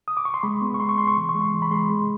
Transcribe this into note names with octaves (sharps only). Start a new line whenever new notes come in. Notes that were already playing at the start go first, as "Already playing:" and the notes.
D#6
D6
C#6
C6
G#3 B5
B3
C#6
G#3 C6
C#6
B3 C6
C#6
E3
C#6
G#3
C6
E3
B5
G#3 C6
G#3